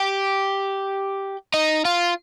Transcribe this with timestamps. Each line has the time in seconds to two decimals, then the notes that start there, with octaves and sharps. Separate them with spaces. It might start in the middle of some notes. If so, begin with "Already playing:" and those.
Already playing: G4
1.54 D#4
1.85 F4